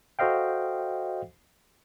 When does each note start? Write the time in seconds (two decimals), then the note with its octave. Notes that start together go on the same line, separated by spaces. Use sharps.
0.19 F#4 A4 C5 D#5 F5 G5